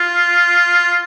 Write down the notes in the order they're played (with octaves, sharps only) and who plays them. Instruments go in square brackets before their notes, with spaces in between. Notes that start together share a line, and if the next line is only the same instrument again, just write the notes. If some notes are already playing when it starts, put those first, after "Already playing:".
Already playing: [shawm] F4